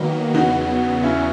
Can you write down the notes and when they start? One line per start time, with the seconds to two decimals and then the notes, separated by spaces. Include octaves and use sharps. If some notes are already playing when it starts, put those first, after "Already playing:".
Already playing: D#3 F#3 A#3 B3 D#4
0.33 E2 C#3 F#3 B3 D#4 F#4
1.03 C#4 E4